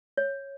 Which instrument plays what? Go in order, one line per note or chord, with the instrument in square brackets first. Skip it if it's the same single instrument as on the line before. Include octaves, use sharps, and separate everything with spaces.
[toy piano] C#5